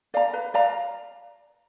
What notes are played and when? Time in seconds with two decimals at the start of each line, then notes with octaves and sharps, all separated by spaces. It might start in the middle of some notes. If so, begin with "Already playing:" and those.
0.14 D5 F5 A#5
0.33 B4
0.54 D5 F5 A#5